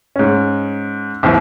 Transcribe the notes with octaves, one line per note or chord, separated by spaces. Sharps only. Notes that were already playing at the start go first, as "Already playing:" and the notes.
G#2 C#4
G#1 D#2 E3